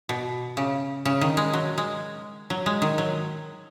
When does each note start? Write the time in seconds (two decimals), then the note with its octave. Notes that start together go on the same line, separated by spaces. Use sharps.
0.09 B2
0.57 C#3
1.05 C#3
1.21 D#3
1.37 G#3
1.53 F#3
1.78 G#3
2.50 F#3
2.66 G#3
2.82 D#3
2.98 F#3